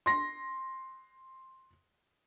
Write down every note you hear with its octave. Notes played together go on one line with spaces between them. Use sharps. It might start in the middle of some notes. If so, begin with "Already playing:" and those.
C6 A#6